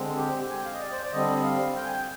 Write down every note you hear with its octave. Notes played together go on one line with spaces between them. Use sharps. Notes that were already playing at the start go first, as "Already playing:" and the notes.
Already playing: D3 G#3 C4
G4
G#5
G5
F5
D#5
D5
C5
D5
D3 G3 C4 D#5
F5
G5
G#5
G5